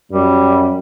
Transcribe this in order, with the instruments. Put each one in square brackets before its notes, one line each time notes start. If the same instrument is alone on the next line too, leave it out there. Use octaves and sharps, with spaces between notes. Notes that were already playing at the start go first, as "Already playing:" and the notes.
[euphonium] F#2 [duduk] G3